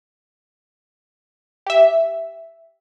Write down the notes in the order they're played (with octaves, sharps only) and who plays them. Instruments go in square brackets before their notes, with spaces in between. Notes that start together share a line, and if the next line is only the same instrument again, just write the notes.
[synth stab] G4 E5